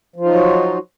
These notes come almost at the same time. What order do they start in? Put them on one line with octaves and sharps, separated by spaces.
F3 F4 D#4 F#3 F#4